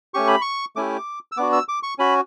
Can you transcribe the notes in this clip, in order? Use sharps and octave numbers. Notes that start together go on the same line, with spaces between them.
A3 C#4 G4 C#6
B5
C#6
A3 C#4 E4 G4 D6
E6
B3 D4 F#4 D6
E6
D6
C#6
C#4 F#4 B5